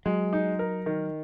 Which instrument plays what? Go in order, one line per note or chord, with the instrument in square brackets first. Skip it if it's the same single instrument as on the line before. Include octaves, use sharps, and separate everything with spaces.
[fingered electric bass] F#3 [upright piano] G#3
[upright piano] D#4
A#4
D#3